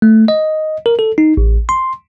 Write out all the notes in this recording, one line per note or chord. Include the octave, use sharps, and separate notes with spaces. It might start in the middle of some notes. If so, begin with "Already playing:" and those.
A3
D#5
A#4
A4
D#4
A1
C6